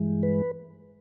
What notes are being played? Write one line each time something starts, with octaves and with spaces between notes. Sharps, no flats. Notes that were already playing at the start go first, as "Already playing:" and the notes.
Already playing: G2 E3 G#3
B4